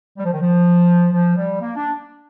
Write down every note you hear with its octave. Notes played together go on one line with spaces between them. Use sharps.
G3
F3
D#3
F3
F3
G3
A#3
D4